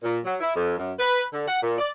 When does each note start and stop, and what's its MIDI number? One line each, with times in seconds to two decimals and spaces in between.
0.03 0.18 46
0.24 0.34 54
0.40 0.55 64
0.55 0.74 41
0.77 0.91 42
0.99 1.23 71
1.32 1.45 50
1.47 1.57 78
1.62 1.78 46
1.78 1.89 74